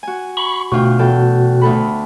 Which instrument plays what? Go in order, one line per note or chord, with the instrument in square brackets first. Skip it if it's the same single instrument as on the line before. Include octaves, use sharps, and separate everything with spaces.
[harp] F#4 G#5
[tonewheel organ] B5 C#6
[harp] D2 F4 G5 [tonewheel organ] B2 F#4
[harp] E2 A4 G5
D2 A4 B5